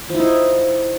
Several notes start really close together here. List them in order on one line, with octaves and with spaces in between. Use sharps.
F3 E4 D#4